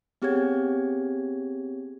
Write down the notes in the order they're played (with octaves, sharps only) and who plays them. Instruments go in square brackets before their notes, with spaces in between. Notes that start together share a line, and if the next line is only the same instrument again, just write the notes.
[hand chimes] B3 C4 G4 G#4 C#5 G#6